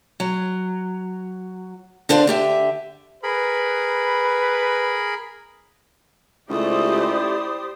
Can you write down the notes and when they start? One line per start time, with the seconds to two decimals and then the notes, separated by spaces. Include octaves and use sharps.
0.20 F#3
2.09 D3 D4 C5 D5 F5
2.27 D3 G4 E5
3.23 G#4 A#4 B4 B5
6.50 C#2 A3 D#4 E4 G4 C5 D5 D#6